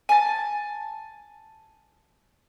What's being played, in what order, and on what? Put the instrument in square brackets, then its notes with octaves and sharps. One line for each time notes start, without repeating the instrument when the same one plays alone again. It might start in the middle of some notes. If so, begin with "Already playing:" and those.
[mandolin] G#5 A5